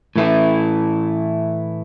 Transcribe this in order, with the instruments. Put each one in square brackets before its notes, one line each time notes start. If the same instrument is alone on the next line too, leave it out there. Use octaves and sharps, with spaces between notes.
[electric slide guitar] A2 E3 A3 E4